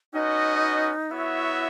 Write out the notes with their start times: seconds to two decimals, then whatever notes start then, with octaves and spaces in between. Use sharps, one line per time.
0.13 C#4 D#4 F#4 B4 D#5
1.11 B3 E4 F#4 C#5 E5